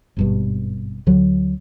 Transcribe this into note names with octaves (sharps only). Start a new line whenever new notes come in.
G#1 G2 B2
D2 D3 F#3